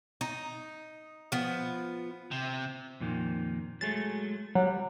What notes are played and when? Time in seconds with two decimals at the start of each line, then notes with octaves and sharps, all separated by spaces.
0.21 D#4
1.32 F3 B3
2.31 C3
3.00 F2 A#2 D#3
3.81 F#3 G#3 A3 A6
4.55 F#3 G3